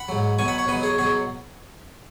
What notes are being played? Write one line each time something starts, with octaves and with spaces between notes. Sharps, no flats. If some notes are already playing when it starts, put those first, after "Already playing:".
Already playing: F#5 B5
G#2 F#3
B2 F#3 G#5 C#6
F#5 B5
C#5 F#5
B2 F#3 B4 D#5
G#4 C#5
B2 F#3 G#4 C#5